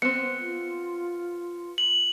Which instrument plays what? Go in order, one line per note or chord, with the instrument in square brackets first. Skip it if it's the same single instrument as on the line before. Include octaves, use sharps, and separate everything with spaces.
[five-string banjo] B3 C4 [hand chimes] C#7
[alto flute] F4
[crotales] F#7